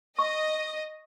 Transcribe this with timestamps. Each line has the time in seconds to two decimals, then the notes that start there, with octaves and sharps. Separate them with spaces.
0.19 D#5 C#6